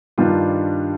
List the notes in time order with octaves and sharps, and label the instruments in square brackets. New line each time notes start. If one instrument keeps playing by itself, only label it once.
[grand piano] G2 D#3 G3 D4 F4